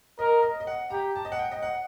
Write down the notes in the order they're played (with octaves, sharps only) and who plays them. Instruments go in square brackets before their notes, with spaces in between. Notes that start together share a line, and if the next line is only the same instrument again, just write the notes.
[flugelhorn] A#4 [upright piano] D#5
[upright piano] D#5
D#5
F#5
[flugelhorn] G4 [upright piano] A#5
[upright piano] A5
D#5
F#5
G5
D#5
F#5